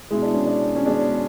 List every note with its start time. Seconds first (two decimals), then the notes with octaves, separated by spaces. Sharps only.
0.11 B2 G#3 E4
0.22 D4
0.34 C#4
0.46 D4
0.76 C#4
0.86 B2 G#3 D4